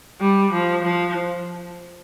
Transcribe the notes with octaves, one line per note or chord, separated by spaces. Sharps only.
G3
F3
F3